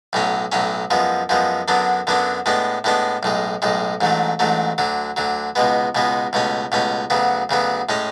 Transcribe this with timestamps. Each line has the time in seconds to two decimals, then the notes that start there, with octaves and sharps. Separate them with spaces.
0.13 B1 A2 F#3 C#4
0.52 B1 A2 F#3 C#4
0.90 F#2 F3 G#3 B3
1.29 F#2 F3 G#3 B3
1.68 F#2 D3 F#3 B3 D4
2.07 F#2 D3 F#3 B3 D4
2.46 A2 G#3 B3 D4
2.84 A2 G#3 B3 D4
3.23 B1 A2 G#3
3.62 B1 A2 G#3
4.01 A1 G#2 F#3 A3
4.39 A1 G#2 F#3 A3
4.78 D2 D3 F#3
5.16 D2 D3 F#3
5.55 C#2 B2 G#3 B3
5.95 C#2 B2 G#3 B3
6.33 C#2 B2 A3 C#4
6.72 C#2 B2 A3 C#4
7.10 D2 C#3 F#3 B3
7.49 D2 C#3 F#3 B3
7.89 A2 G#3 C#4